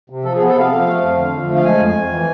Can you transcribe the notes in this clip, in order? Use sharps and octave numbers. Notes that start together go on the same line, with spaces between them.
C3
F3 A4
G#4
B3
A4
C3 F5
F3
A3
F2
D3
F3
A3
F5
G#3 G#5
F2
G#5
F2
E3